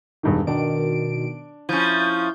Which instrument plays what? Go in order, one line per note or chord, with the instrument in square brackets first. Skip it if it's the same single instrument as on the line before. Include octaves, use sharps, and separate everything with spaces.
[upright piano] E1 G2 D#3
[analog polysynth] B2 D#3 D7 [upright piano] D4
[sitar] F3 C#4 [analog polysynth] E4 G6